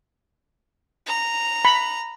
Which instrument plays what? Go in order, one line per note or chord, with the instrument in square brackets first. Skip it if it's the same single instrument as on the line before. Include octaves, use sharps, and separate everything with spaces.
[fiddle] A#5
[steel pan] B5